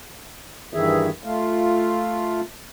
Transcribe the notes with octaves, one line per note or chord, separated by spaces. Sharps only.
G2 D#3 E3 G#4 E5
A3 F4